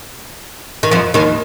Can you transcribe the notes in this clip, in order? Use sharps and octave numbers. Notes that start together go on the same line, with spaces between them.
D#3
F2 F3
D#2 D#3